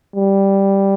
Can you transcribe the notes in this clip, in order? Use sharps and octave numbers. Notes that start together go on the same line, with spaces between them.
G3